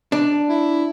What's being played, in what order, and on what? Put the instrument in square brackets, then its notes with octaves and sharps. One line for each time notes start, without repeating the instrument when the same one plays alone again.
[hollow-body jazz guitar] D4
[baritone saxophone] E4